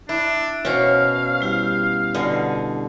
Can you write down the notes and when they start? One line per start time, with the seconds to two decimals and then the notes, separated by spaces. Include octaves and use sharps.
0.09 D4 E4 E5
0.65 B2 C#4 F#4 C5 C#5 F5
1.41 G3 E4 G4
2.14 B2 D3 G#4